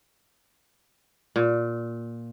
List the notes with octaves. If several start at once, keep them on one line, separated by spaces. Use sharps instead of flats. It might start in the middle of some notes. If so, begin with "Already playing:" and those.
A#2